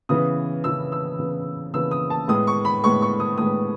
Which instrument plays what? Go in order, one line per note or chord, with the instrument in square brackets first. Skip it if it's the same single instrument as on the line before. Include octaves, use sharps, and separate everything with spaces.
[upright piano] C#3 E3 B3 D#6
C#3 E3 B3 E6
E6
C#3 E3 B3
C#3 E3 B3 E6
D#6
A5
A2 G#3 B3 D#6
C#6
B5
A2 G#3 B3 C#6
C#6
D#6
A2 G#3 B3 D#6